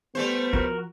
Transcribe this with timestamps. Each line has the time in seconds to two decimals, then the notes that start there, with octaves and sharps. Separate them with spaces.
0.15 G3 A3 B3 C5
0.53 F3 F#4 A#4